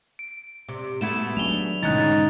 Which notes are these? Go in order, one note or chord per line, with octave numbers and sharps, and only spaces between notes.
D7
C3
A3 B3 F#4 G#6 E7
F#3 G#3 D4 F7 G7
G#2 B2 D3 E3 C#4 D#4 F#6 A6